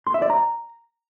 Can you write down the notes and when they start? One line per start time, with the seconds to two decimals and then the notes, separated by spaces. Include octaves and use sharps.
0.07 C6
0.14 E5
0.22 D5
0.30 A#5